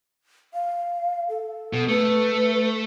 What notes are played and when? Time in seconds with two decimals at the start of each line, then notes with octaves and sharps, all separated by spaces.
0.54 F5
1.29 A4
1.73 B2
1.88 A3 B4